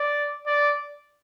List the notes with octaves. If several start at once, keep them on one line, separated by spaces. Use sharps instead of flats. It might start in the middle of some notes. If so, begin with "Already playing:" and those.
Already playing: D5
D5